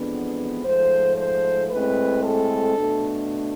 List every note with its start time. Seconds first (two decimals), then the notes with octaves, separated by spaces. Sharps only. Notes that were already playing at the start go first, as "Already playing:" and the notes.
Already playing: F2 E3 G#3 B3 D4
0.64 G#2 F3 A3 C5
1.18 C5
1.71 A2 G#3 C4 B4
2.24 A4
2.77 B2 A3 D4